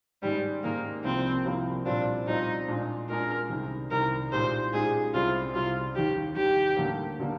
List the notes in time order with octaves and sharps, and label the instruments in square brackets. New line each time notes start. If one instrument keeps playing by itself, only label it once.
[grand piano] G#2 D#3 G#3 [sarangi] G3
[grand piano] G#2 D#3 G#3 [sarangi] A#3
[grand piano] C2 C3 F3 A#3 [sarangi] C4
[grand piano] C2 C3 F3 A#3
[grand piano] A#2 G3 C4 F4 [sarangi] D4
[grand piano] A#2 G3 C4 F4 [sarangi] D#4
[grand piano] A#2 G#3 D4 G#4
[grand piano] A#2 G#3 D4 G#4 [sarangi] A#4
[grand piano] C2 C3 D#3
[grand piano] C2 C3 D#3 [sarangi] A#4
[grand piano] A#2 G#3 D#4 G4 [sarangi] C5
[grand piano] A#2 G#3 D#4 G4 [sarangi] G#4
[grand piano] C2 C3 G3 C4 [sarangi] F4
[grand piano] C2 C3 G3 C4 [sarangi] F4
[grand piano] D#2 D#3 G3 [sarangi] G4
[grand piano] D#2 D#3 G3 [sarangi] G4
[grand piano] D2 D3 G3 A#3
D3 G3 A#3